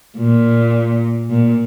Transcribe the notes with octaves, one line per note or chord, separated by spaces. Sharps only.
A#2
A#2